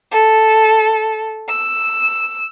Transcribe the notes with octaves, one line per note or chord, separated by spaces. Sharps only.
A4
E6